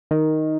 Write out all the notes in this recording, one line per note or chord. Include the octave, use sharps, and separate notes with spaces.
D#3